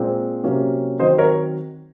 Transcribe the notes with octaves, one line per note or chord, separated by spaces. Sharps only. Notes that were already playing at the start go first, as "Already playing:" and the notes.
Already playing: A#2 G#3 C4
C3 F#3 A#3 C#4
D#3 F#3 C4 C5 D#5
A#4 C#5